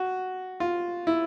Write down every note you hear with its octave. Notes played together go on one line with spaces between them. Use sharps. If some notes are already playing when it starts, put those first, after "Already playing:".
Already playing: F#4
F4
E4